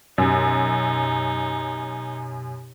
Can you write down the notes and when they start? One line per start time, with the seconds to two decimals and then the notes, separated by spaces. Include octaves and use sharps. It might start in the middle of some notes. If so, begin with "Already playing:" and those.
0.18 F#2 B2 D#4 G4